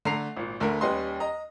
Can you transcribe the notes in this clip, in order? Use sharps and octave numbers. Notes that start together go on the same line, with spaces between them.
D3 A3 A#5 C7 F7
G#1 A#2
D2 D3 A3 A#4
D#2 G3 C#4 B4 D#5 C6
D#5 A#5